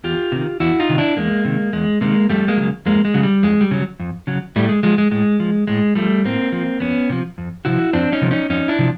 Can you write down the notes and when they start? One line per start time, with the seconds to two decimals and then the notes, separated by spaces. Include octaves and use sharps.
0.04 E2 F4 G4
0.32 C3 D#3
0.60 E2 E4 F#4
0.80 D#4 F4
0.89 C3 D#3
0.98 D4 E4
1.17 E2 G#3 A#3
1.45 C3 D#3
1.73 E2 G#3
2.01 C3 D#3 G#3 A#3
2.29 F2 G3 A3
2.48 G#3 A#3
2.57 C#3 F#3
2.86 F2 G#3 A#3
3.05 G#3
3.14 C#3 F#3
3.23 G3
3.43 F2 G#3
3.61 G3
3.71 C#3 F#3
4.00 F2
4.27 C#3 F#3
4.56 A2 G3 A3
4.69 G#3
4.83 F3 G#3
4.98 G#3
5.11 A2 G#3
5.40 F3
5.67 A2 G#3
5.95 F3 G3 A3
6.25 A2 A#3 C4
6.52 F3
6.80 F2 B3 C#4
7.10 C3 F3
7.38 F2
7.65 C3 F3 E4 F#4
7.93 F2 C4 D4
8.12 C#4 D#4
8.21 C3 F3
8.31 C#4 D#4
8.50 F2 C#4 D#4
8.68 D4 E4
8.79 C3 F3